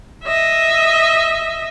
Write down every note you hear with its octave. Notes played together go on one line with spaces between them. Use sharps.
D#5 E5